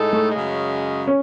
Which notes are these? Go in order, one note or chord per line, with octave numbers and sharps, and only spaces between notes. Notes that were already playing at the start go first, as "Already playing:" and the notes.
Already playing: A2 G#3 D#4 A4
A3
F#2 C#3 G#3
C#4